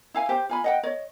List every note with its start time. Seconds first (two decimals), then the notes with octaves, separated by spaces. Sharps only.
0.14 E4 F5 G#5
0.29 G4 C5
0.49 F4 G#5 B5
0.64 D#5 F#5 G5
0.83 C#5 D#5